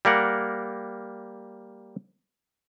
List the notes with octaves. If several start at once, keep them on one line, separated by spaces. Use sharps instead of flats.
G3 A#3 A#4 F#5